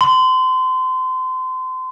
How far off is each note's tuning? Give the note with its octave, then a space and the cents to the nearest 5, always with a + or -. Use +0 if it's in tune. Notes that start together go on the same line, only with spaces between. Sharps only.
C6 -30